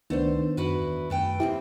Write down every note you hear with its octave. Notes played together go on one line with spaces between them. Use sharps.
C#2 D#3 A3 B3 D4 C5
F#2 E4 F#4 B4
E2
F#2 A3 B4 G5
F3 A#3 C4 E4 G4